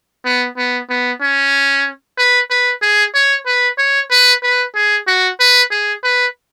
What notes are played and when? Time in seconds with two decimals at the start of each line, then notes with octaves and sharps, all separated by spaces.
0.25 B3
0.57 B3
0.89 B3
1.21 C#4
2.18 B4
2.50 B4
2.82 G#4
3.14 C#5
3.46 B4
3.78 C#5
4.11 B4
4.43 B4
4.75 G#4
5.07 F#4
5.40 B4
5.71 G#4
6.04 B4